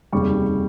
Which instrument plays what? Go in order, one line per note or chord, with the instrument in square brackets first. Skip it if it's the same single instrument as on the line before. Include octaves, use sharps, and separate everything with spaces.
[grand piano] F1 D#2 C#3 G3 C#6